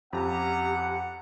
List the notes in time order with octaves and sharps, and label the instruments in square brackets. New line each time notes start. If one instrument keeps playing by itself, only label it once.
[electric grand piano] F2 [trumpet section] C#4 E5 A#5 [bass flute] G4 [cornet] F#5